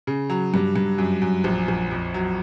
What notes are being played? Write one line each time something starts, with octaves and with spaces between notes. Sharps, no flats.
C#3
F#3
G2
G2
F#2
F#2
A#1
A#1
F2
F#3